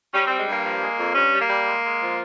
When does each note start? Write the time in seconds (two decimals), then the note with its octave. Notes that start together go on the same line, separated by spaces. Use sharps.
0.13 G3 C#4
0.26 G3 C4
0.39 G#3
0.47 G2 A#3
0.64 F3
0.81 G#3
0.98 F2
1.15 G2 C#4
1.32 G3
1.41 A#3
1.49 G3
1.67 G#3
1.84 G#3
2.00 F3